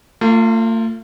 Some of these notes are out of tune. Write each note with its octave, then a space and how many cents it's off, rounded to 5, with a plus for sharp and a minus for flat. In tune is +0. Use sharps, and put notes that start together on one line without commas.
A3 +45 F4 +0